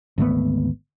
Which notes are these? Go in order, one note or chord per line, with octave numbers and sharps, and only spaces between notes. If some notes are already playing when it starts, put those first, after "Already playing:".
G#1 D2 A3 B3